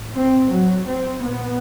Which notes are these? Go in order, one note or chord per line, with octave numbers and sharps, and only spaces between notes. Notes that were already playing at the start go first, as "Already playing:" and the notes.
Already playing: A2
C4
F#3
C4
A#2 B3